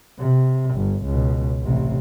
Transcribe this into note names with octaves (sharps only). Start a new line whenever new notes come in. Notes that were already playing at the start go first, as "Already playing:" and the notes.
C3
G1
C#2 B2
A1 C3